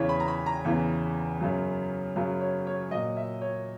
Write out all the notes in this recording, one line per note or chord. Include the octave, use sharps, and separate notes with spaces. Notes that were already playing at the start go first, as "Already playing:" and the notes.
Already playing: E2 C#3 E3 C#5
B5
A#5
B5
A#5
E2 C#3 E3
F#2 C#3 F#3
F#2 C#3 F#3
C#5
C#5
A#2 F#3 D#5
E5
C#5